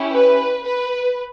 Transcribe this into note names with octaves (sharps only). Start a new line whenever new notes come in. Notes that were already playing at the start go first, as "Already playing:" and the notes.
Already playing: C#4 E4 G4
B4
B4